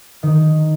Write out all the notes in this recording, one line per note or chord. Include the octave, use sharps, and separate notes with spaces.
D#3